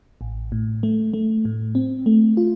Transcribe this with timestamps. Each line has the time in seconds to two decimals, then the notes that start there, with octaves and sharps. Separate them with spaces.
0.21 A1
0.52 A2
0.83 A3
1.13 A3
1.45 A2
1.75 C4
2.06 A3
2.37 F4